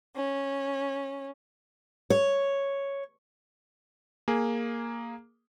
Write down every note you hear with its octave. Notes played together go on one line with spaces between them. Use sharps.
C#4
C#5
A#3 G#4